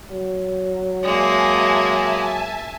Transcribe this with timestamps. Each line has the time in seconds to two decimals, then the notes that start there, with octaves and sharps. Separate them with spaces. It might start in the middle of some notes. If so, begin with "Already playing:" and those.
0.11 F#3
1.03 G#3 A#3 E5 G#5 A5